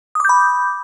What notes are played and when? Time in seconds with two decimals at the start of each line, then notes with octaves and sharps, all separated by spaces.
0.15 D#6
0.20 D6
0.25 G6
0.29 B5